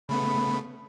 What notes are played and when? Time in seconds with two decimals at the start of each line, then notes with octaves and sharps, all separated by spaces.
0.09 C#3 A3 B3 B5